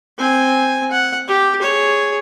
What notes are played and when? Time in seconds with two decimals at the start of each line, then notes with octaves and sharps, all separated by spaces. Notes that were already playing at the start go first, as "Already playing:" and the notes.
0.18 C4 G#5
0.92 F#5
1.28 G4
1.62 G#4 C#5